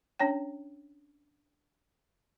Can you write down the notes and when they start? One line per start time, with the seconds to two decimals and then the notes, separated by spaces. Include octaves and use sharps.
0.19 C#4 D4 C#5 G5